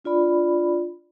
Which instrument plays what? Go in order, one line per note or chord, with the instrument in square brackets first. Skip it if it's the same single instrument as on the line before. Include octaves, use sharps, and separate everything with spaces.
[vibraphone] D4 F4 D5 B5